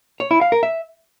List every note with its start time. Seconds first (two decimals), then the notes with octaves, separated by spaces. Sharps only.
0.20 C#5
0.31 E4
0.41 F5
0.52 A#4
0.63 E5